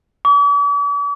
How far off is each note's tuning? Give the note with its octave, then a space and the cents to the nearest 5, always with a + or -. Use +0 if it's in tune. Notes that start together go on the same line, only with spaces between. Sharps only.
D6 -45